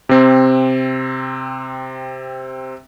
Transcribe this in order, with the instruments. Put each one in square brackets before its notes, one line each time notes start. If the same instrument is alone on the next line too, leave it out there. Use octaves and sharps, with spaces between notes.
[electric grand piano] C3 C4